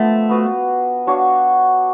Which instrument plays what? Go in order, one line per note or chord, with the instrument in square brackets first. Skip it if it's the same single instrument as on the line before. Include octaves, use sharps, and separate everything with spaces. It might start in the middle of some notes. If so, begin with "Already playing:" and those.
Already playing: [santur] F3 B3 D4 [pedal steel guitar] A3
[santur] B3 F#4 B4 F5
D4 F#4 C#5 F5